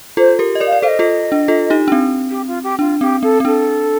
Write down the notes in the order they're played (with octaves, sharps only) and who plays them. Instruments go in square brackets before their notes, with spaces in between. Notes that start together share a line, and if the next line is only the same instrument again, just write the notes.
[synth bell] F4 A4 [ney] C5
[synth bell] G4 A#4
D#5
A#4 D5
[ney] F5
[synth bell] D5
[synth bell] A4 C5 [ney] D#5 F5
[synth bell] F4 A4
D4
F4 A4
D#4 G4
D4
C4
[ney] G4
F4
G4
[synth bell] D4 [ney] F4
[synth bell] C4 [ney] G4
[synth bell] C4 [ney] A4
[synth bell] C4
[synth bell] D4 [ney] A4